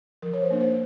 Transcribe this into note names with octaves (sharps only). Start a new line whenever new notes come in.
F3 A#4
C#5
C5
A#3 D4
C5